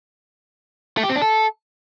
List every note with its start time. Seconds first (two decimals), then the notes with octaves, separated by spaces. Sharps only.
0.97 A3
1.03 G4
1.09 C4
1.16 D4
1.22 A4